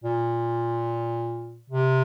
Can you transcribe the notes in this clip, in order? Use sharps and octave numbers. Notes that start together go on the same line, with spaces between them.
A#2
C3